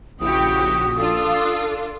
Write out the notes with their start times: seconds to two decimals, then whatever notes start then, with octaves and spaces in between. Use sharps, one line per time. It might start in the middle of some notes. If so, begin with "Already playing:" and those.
0.20 A#1 C#3 E4 F#4 G4 D#6
0.97 D4 F4 A4